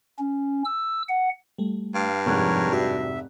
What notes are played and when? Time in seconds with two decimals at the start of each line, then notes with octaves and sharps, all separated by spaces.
0.19 C#4
0.65 E6
1.09 F#5
1.58 G3 A3
1.95 G2 F5
2.26 F1 G#2 F3 A#4 C#5 F#6
2.73 F#4 G4 D5 E5